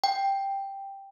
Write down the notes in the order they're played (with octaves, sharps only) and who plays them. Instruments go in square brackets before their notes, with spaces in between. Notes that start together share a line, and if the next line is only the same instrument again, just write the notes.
[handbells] G5